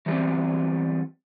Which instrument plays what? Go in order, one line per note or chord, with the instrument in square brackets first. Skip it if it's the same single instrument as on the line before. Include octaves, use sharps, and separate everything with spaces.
[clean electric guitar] E3 F#3 G3 B3 C4